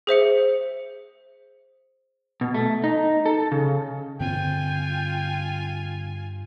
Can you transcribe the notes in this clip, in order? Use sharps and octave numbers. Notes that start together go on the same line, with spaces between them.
G#4 C5 E5 C#7
B2
A3
D#4
A4
C#3
G2 D3 C4 F4 G5 G#5